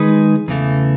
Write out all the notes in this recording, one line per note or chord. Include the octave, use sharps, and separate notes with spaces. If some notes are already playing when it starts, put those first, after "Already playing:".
Already playing: D#3 G#3 D#4 G#4 B4
E2 C#3 E3 A3